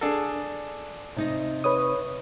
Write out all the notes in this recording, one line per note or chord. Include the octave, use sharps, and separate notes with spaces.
D4 G#4 A4
C3 D#4 D#5
B4 C#5 D#6